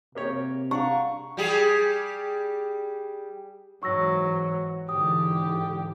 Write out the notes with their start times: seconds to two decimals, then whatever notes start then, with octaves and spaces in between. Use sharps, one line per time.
0.15 C3 A#3 G4 C#5
0.71 D4 F5 F#5 A#5 C#6
1.37 G3 G4 G#4
3.83 G#2 E3 F#3 C#6 E6 A#6
4.89 G#2 D3 E3 G4 D#6